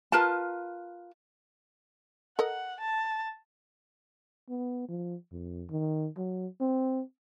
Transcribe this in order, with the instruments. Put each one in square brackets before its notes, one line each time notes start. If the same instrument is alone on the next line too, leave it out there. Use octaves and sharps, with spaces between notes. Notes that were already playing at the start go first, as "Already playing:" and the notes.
[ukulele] F4 A#4 B4 A5
[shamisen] A4 A#4 D#5 [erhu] F#5
[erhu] A5
[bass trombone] B3
F3
F2
D#3
F#3
C4